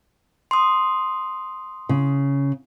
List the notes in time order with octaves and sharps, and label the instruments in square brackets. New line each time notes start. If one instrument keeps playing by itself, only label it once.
[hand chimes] C6 D#6
[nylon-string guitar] C#3